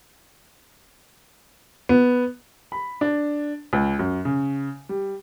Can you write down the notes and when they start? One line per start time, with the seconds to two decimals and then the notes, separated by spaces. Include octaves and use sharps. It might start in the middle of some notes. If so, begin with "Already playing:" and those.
1.89 B3
2.72 B5
3.01 D4
3.73 C#2
3.99 F#2
4.25 C#3
4.89 G3